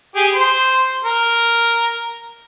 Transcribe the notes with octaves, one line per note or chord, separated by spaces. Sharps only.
G4 G#4
C5
A#4